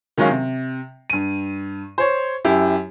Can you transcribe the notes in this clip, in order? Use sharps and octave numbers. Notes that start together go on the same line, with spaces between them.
D#3 F#3 G#3 C#4 F5
C3
G2 D#7
C5 C#5
F#2 E4 G4